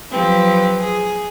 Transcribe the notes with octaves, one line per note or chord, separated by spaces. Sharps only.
F3 F#3 C4 G4 B4
G#4